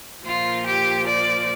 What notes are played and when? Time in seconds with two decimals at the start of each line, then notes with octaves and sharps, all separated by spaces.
0.24 A#2 F3 F4
0.65 G4
1.07 D5